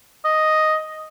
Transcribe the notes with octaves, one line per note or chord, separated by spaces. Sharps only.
D#5